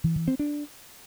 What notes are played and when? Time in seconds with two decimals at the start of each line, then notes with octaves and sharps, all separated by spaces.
0.04 E3
0.16 E3
0.28 C4
0.39 D4